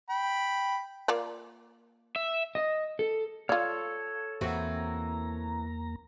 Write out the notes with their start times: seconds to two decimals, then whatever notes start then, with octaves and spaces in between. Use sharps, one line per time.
0.09 G5 B5
1.08 A#3 F4 D5
2.16 E5
2.55 D#5
2.99 A4
3.49 F4 A4 C#5 D5 F5
4.41 E2 E3 A#3 C4 F#4 A#5